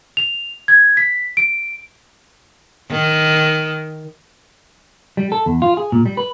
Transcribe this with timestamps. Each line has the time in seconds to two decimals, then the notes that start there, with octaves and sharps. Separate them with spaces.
0.17 F7
0.68 G#6
0.97 B6
1.37 D7
2.91 D#3
5.17 G3
5.32 A4
5.46 E2
5.62 F4
5.77 G#4
5.92 A#2
6.06 G3
6.17 B4